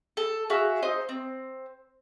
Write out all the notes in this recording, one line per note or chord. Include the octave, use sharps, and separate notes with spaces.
A4
F#4 G#4 E5 F5
D#4 C5 D#5
C4